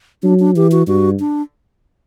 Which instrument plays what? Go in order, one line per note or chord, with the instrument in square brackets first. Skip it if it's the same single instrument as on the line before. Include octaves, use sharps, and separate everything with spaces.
[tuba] F#3 [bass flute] D4
[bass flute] D4
[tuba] E3 [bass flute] G4
[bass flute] F#4
[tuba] G2 [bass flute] F#4
[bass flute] D4